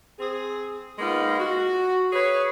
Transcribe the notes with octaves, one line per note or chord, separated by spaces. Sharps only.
C4 G#4
G#3 A#3 B3 D#4 F4
F#4
G#4 B4 C#5